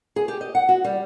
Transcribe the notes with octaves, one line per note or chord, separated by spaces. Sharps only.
G#4
G4
D#5
F#5
F#4
G3